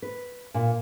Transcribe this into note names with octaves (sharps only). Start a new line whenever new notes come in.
B4
A#2